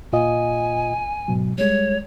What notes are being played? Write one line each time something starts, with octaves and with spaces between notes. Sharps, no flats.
A#2 F4 D#5 G#5
G#2 B2 F#3
G3 G#3 C#5